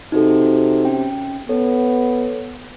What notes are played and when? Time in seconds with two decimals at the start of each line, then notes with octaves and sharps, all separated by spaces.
0.12 C3 D#4 F#4 A4
0.85 C#4 G5
1.49 B3 A4 C#5